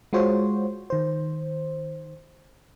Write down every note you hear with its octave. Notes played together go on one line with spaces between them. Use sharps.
G#3 F4 F#4 C5 C#5
D#3 C5